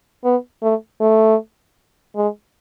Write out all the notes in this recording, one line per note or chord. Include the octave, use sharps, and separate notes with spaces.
B3
A3
A3
G#3